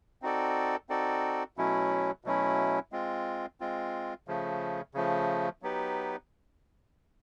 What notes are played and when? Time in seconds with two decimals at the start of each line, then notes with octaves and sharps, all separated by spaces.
0.22 C4 D#4 F#4 A4 D5
0.89 C4 D#4 F#4 A4 D5
1.57 B2 F#3 A3 C#4 E4
2.24 B2 F#3 A3 C#4 E4
2.92 G#3 C4 F4
3.60 G#3 C4 F4
4.28 C#3 F3 A3
4.94 C#3 F3 A3
5.62 F#3 B3 D#4 G4 B4